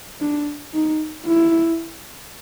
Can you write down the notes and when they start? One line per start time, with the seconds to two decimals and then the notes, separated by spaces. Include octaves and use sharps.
0.21 D4
0.73 D#4
1.26 E4